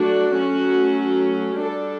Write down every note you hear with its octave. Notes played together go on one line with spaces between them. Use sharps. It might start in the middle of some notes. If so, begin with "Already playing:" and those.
Already playing: F#3 A3 D4 F#4
F#3 A3 C#4
G3 D4 A4